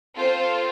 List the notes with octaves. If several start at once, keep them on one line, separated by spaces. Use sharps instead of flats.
C4 F4 A4 C5